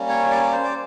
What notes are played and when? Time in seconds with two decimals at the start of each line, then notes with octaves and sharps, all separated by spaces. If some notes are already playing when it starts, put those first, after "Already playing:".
Already playing: G3 A#3 C#4
0.09 C#5
0.30 D5
0.52 C5
0.64 D5